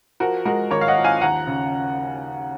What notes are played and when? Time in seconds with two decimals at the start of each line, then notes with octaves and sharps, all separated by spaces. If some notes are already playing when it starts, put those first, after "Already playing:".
0.20 F3 F#4 A#4
0.45 G#3 F#4 A#4
0.71 G#1 A#4 C#5
0.81 F5
0.88 D#5 F#5
0.97 F3
1.04 F5 G#5
1.21 D#2 F#5 A#5
1.47 C#3